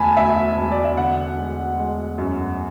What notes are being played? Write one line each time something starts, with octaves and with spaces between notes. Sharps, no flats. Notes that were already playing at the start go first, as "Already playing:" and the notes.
Already playing: E1 D2 G#5 A5 B5
D2 E5
E1
D5
E5
D3 F#5
G#3
G#3
F#2